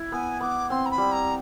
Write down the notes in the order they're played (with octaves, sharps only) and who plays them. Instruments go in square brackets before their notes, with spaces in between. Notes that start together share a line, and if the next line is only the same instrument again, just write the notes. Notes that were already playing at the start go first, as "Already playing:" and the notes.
Already playing: [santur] E4
[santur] B3 [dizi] G#5
[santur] B3 [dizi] D6
[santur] C4 [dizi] C6
[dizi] A#5
B5
[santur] G3
[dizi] A#5